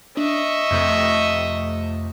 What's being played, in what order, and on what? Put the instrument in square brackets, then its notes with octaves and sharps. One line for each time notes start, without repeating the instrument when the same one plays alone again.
[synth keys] D4 [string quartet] D#5 E5 C#6
[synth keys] F2 C3 A3